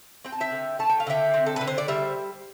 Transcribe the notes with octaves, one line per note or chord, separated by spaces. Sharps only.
C4 G5
A5
E5 G5
D3
A3 A5
G5
F5
D3 E5 G5
C4
A4
D3 B4
C5
D5
G3 C5 E5